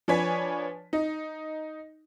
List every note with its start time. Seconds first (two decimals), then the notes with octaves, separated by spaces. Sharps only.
0.08 F3 D4 B4 C#5 G#5 B6
0.93 D#4